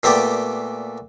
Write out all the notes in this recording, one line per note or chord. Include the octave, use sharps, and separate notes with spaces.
A#2 A3 B3 G4 D5 G5